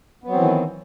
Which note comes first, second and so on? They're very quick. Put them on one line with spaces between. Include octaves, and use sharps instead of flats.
B3 F#3 C4 E3 D#3